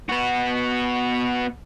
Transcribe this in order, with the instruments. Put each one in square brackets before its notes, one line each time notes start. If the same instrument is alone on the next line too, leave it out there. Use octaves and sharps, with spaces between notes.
[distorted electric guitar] B3 F#4